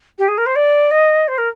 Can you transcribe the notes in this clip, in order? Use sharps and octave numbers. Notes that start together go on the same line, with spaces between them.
G4
G#4
A#4
C5
D5
D#5
C5
A#4